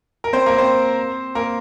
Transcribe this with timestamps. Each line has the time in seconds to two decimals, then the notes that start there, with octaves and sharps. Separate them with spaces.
0.24 A#4
0.33 C4 C5
0.46 A#3 A#4
0.58 C4 C5
1.35 A#3 A#4